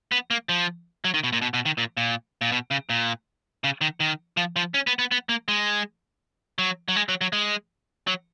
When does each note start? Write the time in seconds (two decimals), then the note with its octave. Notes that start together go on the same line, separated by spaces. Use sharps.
0.12 B3
0.31 A#3
0.49 F3
1.04 F#3
1.14 D#3
1.24 B2
1.33 A#2
1.42 B2
1.54 B2
1.66 D#3
1.78 A#2
1.97 A#2
2.41 A#2
2.52 B2
2.71 C#3
2.90 A#2
3.64 C#3
3.81 D#3
4.00 D#3
4.37 F3
4.56 F3
4.74 C#4
4.87 B3
4.99 B3
5.11 B3
5.29 A#3
5.48 G#3
6.59 F#3
6.88 F#3
6.96 G#3
7.09 F#3
7.21 F#3
7.33 G#3
8.07 F#3